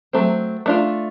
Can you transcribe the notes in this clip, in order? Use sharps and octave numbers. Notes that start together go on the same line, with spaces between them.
F#3 A3 C4
A3 D4 F4